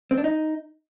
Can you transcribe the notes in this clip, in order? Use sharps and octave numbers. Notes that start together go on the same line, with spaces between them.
C4
D4
D#4